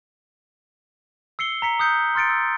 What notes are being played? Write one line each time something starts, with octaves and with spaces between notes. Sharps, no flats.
E6 C7 C#7 G7
A#5 B6 C#7
D#6 F#6 G6 C#7
C6 F6 A6 C#7 D7
E6